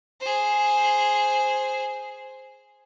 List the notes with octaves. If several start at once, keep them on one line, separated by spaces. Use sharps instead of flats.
G#4 C5